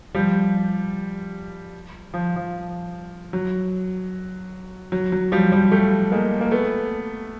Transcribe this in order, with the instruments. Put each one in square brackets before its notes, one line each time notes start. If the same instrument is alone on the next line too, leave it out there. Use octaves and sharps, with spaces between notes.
[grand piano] F3 G3
F3
F3
F#3
F#3
F#3
F3 G3
F3 G3
G3 A3
G#3 A#3
A#3
A3 B3